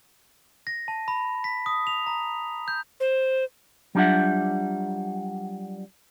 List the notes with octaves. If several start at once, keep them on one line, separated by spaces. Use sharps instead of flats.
A#6
A5
B5
B6
D#6
F7
A#5
G6
C5
F#3 G3 D4 F4 E5 F#5